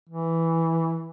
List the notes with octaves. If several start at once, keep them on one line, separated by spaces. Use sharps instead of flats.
E3